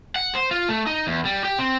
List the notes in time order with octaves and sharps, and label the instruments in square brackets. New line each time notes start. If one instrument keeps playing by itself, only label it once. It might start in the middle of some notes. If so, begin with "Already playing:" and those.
[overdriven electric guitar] F#5
C5
F4
A3
D#4
E2
G3
G4
C4